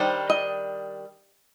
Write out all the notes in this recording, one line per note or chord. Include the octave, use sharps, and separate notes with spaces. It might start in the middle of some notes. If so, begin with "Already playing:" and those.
Already playing: D#3 G3 D4 C5
D#5